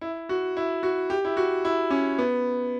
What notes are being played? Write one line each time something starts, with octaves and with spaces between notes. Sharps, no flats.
E4
F#4
E4
F#4
G4
E4
F#4
E4
C#4
B3